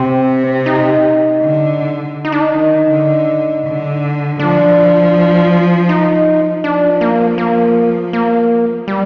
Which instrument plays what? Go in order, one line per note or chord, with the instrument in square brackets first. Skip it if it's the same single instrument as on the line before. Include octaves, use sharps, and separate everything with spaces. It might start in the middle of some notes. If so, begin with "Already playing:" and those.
Already playing: [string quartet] C3 [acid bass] C4
[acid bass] D#4
[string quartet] D3
[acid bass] D#4
D4
D#4
[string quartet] D#3
D3
D3
[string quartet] F3 [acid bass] D4
[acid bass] D#4
[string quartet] F3 [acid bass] D4
[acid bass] A#3
A#3
A#3
G3